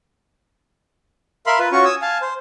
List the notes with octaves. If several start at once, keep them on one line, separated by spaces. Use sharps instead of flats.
A#4 E5 F5 B5 C6
F4 B4
C#4 F4 F#4 C#5 C#6
G#5 D#6 E6
F5 G#5 A5
C5